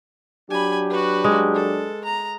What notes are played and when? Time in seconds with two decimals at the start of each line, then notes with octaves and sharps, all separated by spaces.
0.50 F#3 D4 G4 G#5 B5
0.90 F#4 B4
1.24 G#3
1.55 A4
2.04 A#5